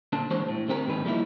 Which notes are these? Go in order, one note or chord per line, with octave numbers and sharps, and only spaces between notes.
A#2 D3 D4 A5
E3 G#3 D4 G4 C5 C#5
A2
D3 C4 G4 A#4
D#2 G#2 D#3 B4
F3 G3 G#3 A#3 D#4 E4